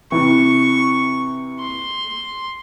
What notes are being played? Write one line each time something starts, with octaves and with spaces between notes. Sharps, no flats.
C3 E3 C#6
C6